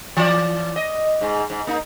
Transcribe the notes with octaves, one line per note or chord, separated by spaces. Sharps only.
E3 D5
D#5
G#2 G#3
G#2
A#3 D#4